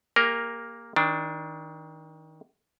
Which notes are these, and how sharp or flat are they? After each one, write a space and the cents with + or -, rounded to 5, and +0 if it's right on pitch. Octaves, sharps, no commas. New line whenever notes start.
A#3 +0 G4 +45 A#4 +0
D#3 +30 D4 +0